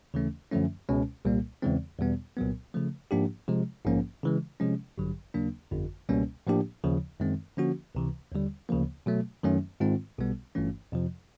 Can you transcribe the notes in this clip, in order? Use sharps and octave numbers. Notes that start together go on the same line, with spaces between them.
D#2 C#3 E3 A3 C#4
F#2 D3 F3 A3 C#4
C#2 B2 G#3 C#4
C2 A#2 G3 A#3
E2 C#3 E3 G#3 C4
E2 B2 G3 B3
C2 A#2 F#3 B3
C#3 F3 A3
G#2 F3 A#3 D4 G4
C3 F3 G#3
A#1 G#2 F3 A#3 C#4
C#3 E3 G#3
C3 F3 G#3 C#4
A1 G2 D3 F#3
D#2 C#3 F#3 A#3 D4
G1 F2 D3
C#2 B2 G3 A#3 C#4
A2 F3 A#3 D4 G4
D#2 C#3 F3
F#2 D#3 G#3 C4
D3 F3 A#3 C#4 F#4
C#2 C3 E3
D#2 D3 G3
D2 C#3 F3 A#3
B2 F#3 A3
F#2 D#3 F#3 A3 C#4
G#2 D#3 G#3 C4 F4
B1 B2 G3 B3
G1 G2 E3 A3 C#4
F2 C3 F3